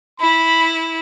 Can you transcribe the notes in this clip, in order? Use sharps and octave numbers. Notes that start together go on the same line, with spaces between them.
E4 B5